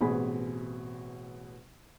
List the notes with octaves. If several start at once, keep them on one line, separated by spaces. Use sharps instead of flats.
A1 B2 C4 G#4 G#5 B5